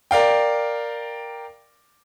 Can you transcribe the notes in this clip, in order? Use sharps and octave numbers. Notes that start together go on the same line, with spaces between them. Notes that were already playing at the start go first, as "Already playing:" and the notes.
A#4 D5 F5 G5